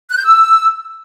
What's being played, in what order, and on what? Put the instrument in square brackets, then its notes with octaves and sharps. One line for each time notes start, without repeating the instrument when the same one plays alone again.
[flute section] F#6
G6
E6